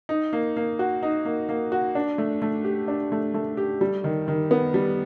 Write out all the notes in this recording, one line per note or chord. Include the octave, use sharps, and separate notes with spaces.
D#4
A#3
A#3
F#4
D#4
A#3
A#3
F#4
D4
A3
A3
G4
D4
A3
A3
G4
G3
D#3
D#3
B3
G3